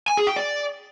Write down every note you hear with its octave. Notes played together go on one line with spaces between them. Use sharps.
G#5
G#4
G5
D5